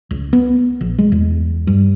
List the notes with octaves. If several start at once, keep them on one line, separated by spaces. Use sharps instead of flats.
C#2
B3
A#1
G#3
E2
G2